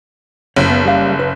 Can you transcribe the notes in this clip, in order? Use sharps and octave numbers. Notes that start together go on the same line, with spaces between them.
F#1 C#5
B3
G3 F5
B4